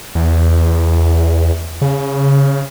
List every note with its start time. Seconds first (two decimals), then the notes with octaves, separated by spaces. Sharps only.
0.15 E2
1.82 C#3